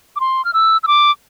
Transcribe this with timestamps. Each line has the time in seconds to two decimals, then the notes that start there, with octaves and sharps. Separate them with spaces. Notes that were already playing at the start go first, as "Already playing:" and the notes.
0.16 D6
0.20 C6
0.45 F6
0.53 E6
0.83 E6
0.87 D6